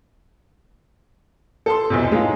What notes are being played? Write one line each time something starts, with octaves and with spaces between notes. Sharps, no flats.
A4 A5 C6
B1 E2 C3
F#3 G#3 D#4 F4